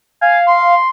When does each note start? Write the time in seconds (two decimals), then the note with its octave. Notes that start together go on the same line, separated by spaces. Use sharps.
0.21 F5 G#5
0.47 C6